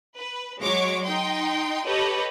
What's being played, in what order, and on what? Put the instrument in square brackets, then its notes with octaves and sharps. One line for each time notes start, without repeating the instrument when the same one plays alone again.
[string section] B4
F#3 G#3 C#5 C#6 D6
D#4 G5 C6
G4 A4 B4 C#5 D#5